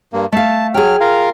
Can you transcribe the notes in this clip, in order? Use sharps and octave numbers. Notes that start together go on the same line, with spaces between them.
G2 A#3
A3 F5 A5
F#3 G#4 G5 F6
F4 A#4 F5